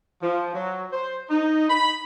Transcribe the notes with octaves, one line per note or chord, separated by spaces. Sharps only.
F3
F#3
C5
D#4
B5